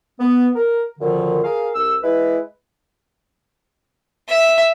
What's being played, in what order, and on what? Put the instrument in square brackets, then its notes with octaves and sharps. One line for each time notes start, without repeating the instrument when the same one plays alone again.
[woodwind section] B3
A#4
F#2 A#2 D3 D#3 F3
G#4 A#4 F5
C2 E6
G#3 E4 B4
[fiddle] E5